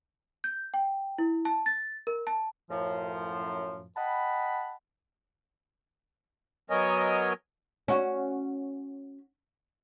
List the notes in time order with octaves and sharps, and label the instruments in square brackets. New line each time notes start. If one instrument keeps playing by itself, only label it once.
[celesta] G6
G5
E4
A5
A6
A#4
A5
[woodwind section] F#2 A2 F3
D#5 F#5 G5 A5 B5
[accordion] F#3 B3 A#4 C#5 D#5 G#5
[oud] C#4 F#4